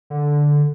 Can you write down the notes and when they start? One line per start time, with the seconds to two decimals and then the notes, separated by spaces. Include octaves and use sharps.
0.10 D3